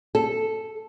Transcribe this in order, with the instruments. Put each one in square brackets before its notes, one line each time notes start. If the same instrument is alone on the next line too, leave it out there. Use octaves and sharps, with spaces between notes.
[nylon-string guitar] A4